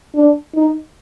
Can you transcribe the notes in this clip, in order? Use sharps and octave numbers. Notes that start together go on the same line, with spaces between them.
D4
D#4